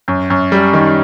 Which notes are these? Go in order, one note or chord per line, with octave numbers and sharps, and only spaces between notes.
F#2
F#2
G3
D#3